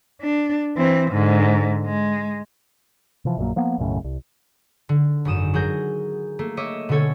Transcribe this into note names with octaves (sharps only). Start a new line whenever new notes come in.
D4
E3 C4
G#2 D3
G#3
C3 E3 F3
A#1 F#2 F#3 A#3
F3 A#3 B3
B1 F#2 A2 C#3
C2
D3
G#1 F#2 D#6 E7
F#3 G#4 A#4 G6 A#6
A3 A#3
C#5 D#5 E5 D6
B2 D3 C#4 A4 C#5 G#6